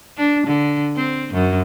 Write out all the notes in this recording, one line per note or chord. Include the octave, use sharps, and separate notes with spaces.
D4
D3
C4
F#2